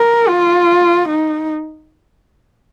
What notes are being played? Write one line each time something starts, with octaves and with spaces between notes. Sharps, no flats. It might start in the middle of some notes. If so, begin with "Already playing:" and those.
Already playing: A#4
F4
D#4